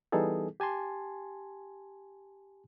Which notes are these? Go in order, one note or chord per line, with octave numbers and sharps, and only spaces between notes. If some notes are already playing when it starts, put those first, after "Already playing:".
E3 G3 B3 D#4 G#4 A4
G4 G#5 A5 C6